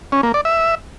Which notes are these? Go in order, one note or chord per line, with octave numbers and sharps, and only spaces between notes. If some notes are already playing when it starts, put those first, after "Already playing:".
C#4
A#3
D5
E5